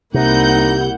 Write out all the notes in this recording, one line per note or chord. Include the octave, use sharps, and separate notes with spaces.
C2 C3 A#3 D#4 E4 F#5 G6